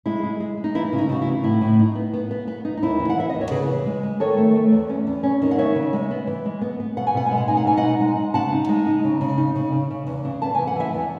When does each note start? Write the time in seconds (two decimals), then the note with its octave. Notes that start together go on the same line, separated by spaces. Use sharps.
0.06 G#3 E4
0.23 G#3
0.40 G#3
0.57 G#3
0.64 D#4
0.75 E3 E4
0.93 C#3
0.98 D#4
1.09 C#3 F#4
1.21 E4
1.26 E3
1.43 A2 E4
1.61 A2
1.79 D#4
1.95 B3
2.13 B3
2.31 B3
2.48 B3
2.65 D#4
2.77 D#4
2.82 D#2 E4
2.99 E3
3.10 F#5
3.17 E3 E5
3.30 D#2 D#5
3.41 C#5
3.51 C#3 G#4 B4
3.68 E3
3.86 G#3
4.03 G#3
4.20 D#3 A4 C#5
4.37 A3
4.55 A3
4.72 E2
4.89 C#4
5.07 E2
5.23 C#4
5.42 D#3
5.51 F#5
5.58 B3 C#5 E5
5.75 C#3
5.93 G#3
6.11 B3
6.27 E3
6.45 G#3
6.61 B3
6.80 B3
6.97 B2 F#5
7.07 G#5
7.14 B2 F#5
7.26 G#3 G#5
7.37 F#5
7.48 D#4 G#5
7.57 F#5
7.65 B2 G#5
7.77 D#5 F#5
7.83 D#4
8.00 G#3
8.17 G#3
8.34 C#3 F#5 A5
8.52 D#4
8.69 G#3
8.86 D#4
9.04 C#3
9.21 C#3
9.38 D#4
9.55 C#3
9.72 C#3
9.90 C#3
10.07 E2
10.25 C#3
10.42 B3 A5
10.55 E3 G#5
10.67 F#5
10.76 E3 E5 G#5
10.93 E2